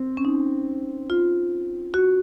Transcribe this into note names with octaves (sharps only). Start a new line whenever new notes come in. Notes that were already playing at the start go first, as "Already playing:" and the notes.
Already playing: C4
C#4
D#4
F4
F#4